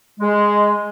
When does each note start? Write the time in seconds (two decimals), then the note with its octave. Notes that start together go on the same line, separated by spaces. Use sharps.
0.20 G#3